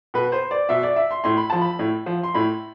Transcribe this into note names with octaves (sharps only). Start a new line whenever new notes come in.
B2 B4
C5
D5
B2 E5
D5
E5
C6
A2 C6
B5
F3 A5
B5
A2
F3
C6
A2 B5